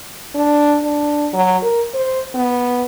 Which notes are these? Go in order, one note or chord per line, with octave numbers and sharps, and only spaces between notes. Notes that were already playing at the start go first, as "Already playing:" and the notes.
D4
D4
F#3
A#4
C5
B3